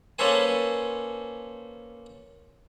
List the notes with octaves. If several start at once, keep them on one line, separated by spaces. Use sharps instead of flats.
A#3 C#4 A4 B4 C5 G#5